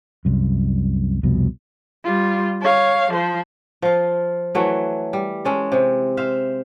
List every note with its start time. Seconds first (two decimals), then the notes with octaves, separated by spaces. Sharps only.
0.25 C2 F#2
1.23 C2 F2 B2
2.05 G3 F4
2.62 C#5 F5
3.12 F3 C5
3.82 F3 F4
4.55 E3 F#3 A3
5.13 G3
5.45 G#3 C#4 A4
5.72 C3 G#3
6.17 C5 E5 F5